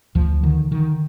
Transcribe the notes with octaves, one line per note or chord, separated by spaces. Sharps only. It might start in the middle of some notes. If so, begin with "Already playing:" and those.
D2 F3
D3 D#3
D3 D#3